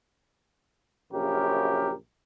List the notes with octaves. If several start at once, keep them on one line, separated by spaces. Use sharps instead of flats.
A#1 F#2 C#3 G4 A#4